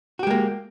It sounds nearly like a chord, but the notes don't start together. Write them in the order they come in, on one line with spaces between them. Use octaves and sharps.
F#4 G4 G#3 A#3